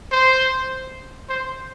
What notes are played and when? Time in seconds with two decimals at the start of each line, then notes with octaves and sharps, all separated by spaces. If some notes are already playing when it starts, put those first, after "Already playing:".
0.12 C5
1.29 C5